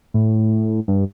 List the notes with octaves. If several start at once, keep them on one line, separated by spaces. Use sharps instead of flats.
A2
G2